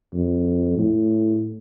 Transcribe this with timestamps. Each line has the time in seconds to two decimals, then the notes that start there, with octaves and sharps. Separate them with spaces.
0.14 F2
0.78 A2